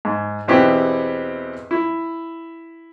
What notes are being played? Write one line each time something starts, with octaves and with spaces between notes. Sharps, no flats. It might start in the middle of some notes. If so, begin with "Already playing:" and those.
G#2
E2 B2 C4 E4 G4 B4
E4